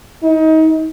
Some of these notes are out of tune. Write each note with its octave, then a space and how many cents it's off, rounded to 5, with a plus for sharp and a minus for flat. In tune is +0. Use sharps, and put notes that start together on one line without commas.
D#4 +30